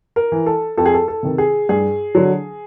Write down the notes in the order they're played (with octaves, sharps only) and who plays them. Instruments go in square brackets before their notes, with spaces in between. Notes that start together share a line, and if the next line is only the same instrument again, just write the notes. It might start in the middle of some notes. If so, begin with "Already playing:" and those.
[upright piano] A#4
E3
A4
F2 A4
G#4
A4
A4
C3 D#3
G#4
G2 G#4
D3 F#3